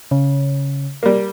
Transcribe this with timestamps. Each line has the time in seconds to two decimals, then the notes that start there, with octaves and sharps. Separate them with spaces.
0.11 C#3
1.03 G3 A#3